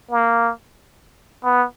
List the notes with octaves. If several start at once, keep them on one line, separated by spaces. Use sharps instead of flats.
A#3
B3